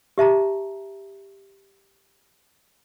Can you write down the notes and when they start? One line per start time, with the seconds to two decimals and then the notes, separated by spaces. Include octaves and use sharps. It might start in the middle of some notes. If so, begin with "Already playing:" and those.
0.18 G4 E5 A5 A#5